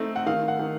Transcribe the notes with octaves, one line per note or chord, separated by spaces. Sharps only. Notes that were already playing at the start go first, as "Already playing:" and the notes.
Already playing: A3 C4 D#4
F#5
D#3 F5
F#5
D#3